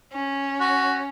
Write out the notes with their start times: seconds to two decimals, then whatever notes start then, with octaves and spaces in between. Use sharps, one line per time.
0.13 C#4
0.60 F#4